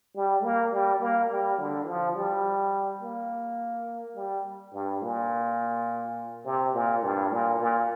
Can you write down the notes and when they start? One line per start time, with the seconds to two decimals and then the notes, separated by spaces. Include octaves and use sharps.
0.16 G3
0.44 A#3
0.72 G3
1.01 A#3
1.30 G3
1.59 D3
1.87 F3
2.16 G3
3.01 A#3
4.16 G3
4.73 G2
5.02 A#2
6.45 C3
6.74 A#2
7.03 G2
7.32 A#2
7.60 A#2